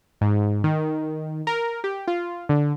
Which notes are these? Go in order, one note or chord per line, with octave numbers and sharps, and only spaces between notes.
G#2
D#3
A#4
G4
F4
D3